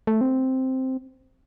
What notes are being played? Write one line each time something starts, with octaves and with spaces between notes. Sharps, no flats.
A3
C4